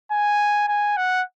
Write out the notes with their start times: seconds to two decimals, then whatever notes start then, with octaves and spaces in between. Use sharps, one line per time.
0.12 G#5
0.68 G#5
0.97 F#5